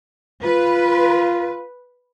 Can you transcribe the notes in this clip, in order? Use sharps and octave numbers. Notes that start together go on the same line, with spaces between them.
F4 B4